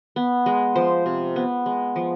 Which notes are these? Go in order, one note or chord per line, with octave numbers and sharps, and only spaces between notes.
B3
G#3
F3 C5
C3
B3
G#3
F3